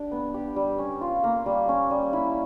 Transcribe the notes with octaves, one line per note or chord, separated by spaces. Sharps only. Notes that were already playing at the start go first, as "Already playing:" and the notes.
Already playing: D4 G4
B3
G4
G3
C#4
F4
A#3
G3
C#4
G3
E4